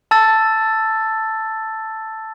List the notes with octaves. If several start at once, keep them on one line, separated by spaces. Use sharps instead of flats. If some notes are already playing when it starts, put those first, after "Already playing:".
A5 E6 A6